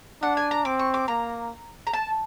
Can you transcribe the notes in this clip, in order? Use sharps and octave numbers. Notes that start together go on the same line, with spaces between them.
D4 F#5
G#5
A#5
C4 D6
C#6
D6
A#3 A#5
A#5
A5